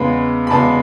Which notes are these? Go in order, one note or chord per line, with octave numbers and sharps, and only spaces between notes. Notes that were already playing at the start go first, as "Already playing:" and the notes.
Already playing: E2 C#3 G#3 B3 B5
B5
E2 C#3 G#3 B3 A5